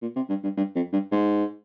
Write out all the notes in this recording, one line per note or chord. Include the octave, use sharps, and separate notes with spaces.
A#2
C3
G2
G2
G2
F2
G2
G#2